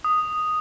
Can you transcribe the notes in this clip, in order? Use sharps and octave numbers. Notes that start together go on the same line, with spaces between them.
D#6